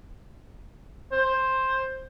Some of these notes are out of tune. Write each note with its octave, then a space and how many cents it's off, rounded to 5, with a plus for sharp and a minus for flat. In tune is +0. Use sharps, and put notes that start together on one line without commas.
C5 +10